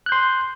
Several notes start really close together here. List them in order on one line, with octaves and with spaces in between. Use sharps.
F#6 G6 C6